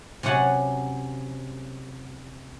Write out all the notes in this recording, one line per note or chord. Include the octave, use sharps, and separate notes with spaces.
C3 F#3 C#4 F#5 G#5 A5